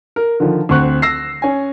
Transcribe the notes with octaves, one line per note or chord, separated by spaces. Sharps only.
A#4
D3 D#3 F3
D2 C4 C#6 F#6
E6 A#6 C7
C#4 G#5